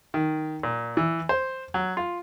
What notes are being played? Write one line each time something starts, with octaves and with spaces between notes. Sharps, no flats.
D#3
A#2
E3
C5
F#3
F4